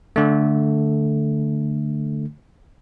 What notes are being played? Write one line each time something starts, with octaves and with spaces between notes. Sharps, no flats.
D3 A3